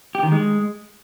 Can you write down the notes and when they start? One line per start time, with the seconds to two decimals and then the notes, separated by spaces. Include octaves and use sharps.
0.15 G4
0.23 D#3
0.32 G#3